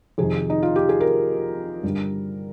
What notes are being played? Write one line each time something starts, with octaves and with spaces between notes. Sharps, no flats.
F2 C3 D#3 G#4
D#4
F4
G4
G#4
A#4
G2 D3 G3